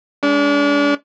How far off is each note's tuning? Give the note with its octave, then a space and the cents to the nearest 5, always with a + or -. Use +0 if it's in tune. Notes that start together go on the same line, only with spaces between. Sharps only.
G#3 +0 D4 -35